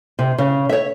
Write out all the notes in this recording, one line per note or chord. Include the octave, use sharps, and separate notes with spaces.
C3
C#3
C#5 E5